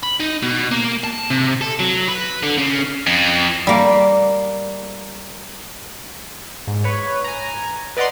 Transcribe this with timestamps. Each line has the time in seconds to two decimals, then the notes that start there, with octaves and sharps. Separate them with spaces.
0.03 B5
0.20 D#4
0.43 B2
0.72 A#3
1.04 A5
1.30 C3
1.61 A4
1.80 F#3
2.08 B4
2.43 D3
2.58 C#3
3.07 F2
3.67 G3 A#3
6.67 G#2
6.84 B4 C#5
7.24 G#5 A#5
7.97 B4 D5 D#5 F#5 A#5 C6